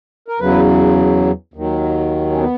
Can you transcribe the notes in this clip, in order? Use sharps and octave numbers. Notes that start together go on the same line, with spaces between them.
A#4
E2 C#3 F#3 B4
D#2 D#3 F#3
C#4
B3